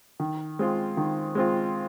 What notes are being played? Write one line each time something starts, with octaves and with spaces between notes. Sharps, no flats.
D#3
G#3 C4 F4
D#3
G#3 C4 F4